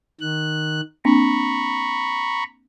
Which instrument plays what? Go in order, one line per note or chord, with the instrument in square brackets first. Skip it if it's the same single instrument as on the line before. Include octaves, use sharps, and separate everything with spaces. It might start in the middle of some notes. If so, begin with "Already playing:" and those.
[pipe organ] D#3 F#6
[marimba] A#3 C4 D4 [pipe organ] A#5 B5 C#6